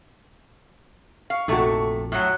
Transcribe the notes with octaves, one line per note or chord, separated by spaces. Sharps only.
F5 C#6
A#1 F2 C3 A3 D#4 F#4 A4
A2 F#3 C#5 F#5 F#6